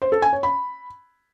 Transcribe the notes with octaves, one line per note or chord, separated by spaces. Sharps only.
C5
A4
G#5
C#5
B5